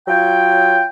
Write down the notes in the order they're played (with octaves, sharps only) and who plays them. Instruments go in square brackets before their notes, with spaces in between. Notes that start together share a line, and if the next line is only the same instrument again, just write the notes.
[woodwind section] F#3 F4 C#5 G5